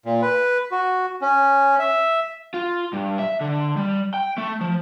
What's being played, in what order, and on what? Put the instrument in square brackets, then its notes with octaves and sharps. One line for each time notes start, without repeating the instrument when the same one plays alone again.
[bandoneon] A#2
B4
F#4
C#4
E5
[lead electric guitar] F4
G2
E5
D3
G3
G5
A3
F3